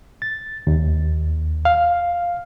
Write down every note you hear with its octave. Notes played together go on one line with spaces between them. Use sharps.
A6
D#2
F5